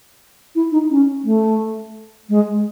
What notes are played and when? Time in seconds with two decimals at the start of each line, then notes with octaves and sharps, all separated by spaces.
0.55 E4
0.72 D#4
0.91 C#4
1.24 A3
2.29 G#3